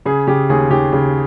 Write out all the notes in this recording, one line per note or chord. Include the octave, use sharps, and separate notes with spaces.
C#3 G#4
C#3 G4
D#2 G#4
D#2 G4
C#3